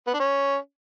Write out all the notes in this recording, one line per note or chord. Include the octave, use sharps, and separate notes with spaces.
B3
D4
C#4